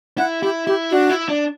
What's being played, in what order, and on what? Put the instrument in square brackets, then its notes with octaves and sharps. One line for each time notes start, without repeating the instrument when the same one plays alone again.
[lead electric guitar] E4 [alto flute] F#5
[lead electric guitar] E4 [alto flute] G4
[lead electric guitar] E4 [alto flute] G4
[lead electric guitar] D4 [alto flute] F#4
[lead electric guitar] E4
D4